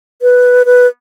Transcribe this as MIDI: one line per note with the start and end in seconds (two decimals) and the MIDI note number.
0.22 0.63 71
0.65 0.87 71